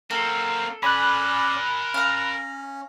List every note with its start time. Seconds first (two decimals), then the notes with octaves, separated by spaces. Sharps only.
0.11 F#3 A#3 C4 A4 A#4
0.83 C#4 A#4 D5 G#5 B5 F#6
1.94 C#4 F5 A#5